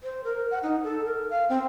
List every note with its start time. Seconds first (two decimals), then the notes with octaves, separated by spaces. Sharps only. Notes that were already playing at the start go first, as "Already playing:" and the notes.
0.03 C5
0.24 A#4
0.51 F#5
0.63 D#4
0.84 A4
1.05 A#4
1.30 F5
1.49 C4